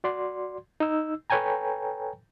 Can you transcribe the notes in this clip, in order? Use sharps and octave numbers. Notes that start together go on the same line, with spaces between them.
F#4 D5 C6
D#4 E6
A4 B4 C#5 G5 G#5 A#5